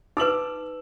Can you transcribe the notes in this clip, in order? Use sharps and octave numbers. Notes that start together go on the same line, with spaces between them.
D#4 B4 D6 E6 F#7